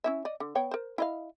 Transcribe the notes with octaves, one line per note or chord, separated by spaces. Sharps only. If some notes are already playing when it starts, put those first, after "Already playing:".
C#4 E4 E5
D5 D#5
D3
B3 C#5 G5
A#4 C5
E4 D#5 F5